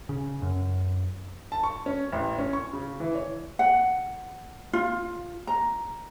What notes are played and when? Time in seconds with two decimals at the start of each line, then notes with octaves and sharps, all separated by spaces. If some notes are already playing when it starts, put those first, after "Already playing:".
0.09 C#3
0.42 F#2
1.52 A5
1.63 C#6
1.86 C#4
2.12 A1
2.38 C#4
2.53 C#6
2.73 C#3
3.00 E3
3.15 C#5
3.59 F#5
4.73 F4
5.47 A#5